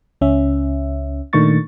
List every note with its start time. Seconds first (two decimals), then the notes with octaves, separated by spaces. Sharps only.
0.21 C#2 C#4 E5
1.33 A#2 D#3 A3 D4 C#6 A6